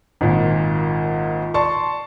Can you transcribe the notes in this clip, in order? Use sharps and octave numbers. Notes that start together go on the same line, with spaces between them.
G#1 A#2
D5 A5 C6 C#6